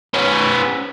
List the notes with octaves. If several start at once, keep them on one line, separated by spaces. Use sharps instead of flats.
B3 C#4